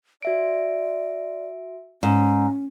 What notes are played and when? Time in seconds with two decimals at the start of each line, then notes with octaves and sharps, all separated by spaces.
0.22 F#4 D5 E5 D7
2.03 G#2 C#4